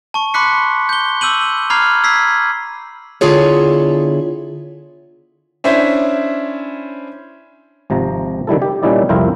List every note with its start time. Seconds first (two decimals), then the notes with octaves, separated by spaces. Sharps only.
0.14 A5 C#6
0.34 B5 C6 D6 F#6 B6 C#7
0.89 G6 G7
1.21 D6 E6 G6 D#7 F#7
1.70 A#5 B5 D6 F6 G#6 C7
2.04 E6 G#6 B6 C7
3.21 D3 B3 E4 F4 G#4 C#5
5.64 C#4 D4 E4 C5 E5
7.90 G#1 C3 F3 A#5
8.47 D#3 G3 E4 A4
8.62 G4
8.83 A#2 G3 C#4 D#4 E4 D5
9.09 C2 F2 E4 F4 A#4 G5